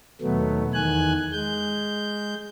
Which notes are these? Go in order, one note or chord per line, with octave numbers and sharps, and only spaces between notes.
D#2 B2 F#3 A3 B3
E2 D#3 G#5 F#6
G#3 G6